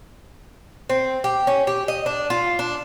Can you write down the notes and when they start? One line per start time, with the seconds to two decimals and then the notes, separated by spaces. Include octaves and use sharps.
0.89 C4
1.24 G4
1.47 C#4
1.67 G4
1.88 D#5
2.06 D4
2.30 F4
2.59 D4